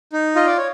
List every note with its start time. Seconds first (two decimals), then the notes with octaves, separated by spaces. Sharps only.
0.13 D#4
0.36 F4 D#5
0.46 D5
0.57 C#5